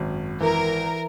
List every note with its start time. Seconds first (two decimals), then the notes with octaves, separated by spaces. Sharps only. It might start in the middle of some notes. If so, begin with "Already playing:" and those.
Already playing: G#1 F#2
0.40 E3 A#4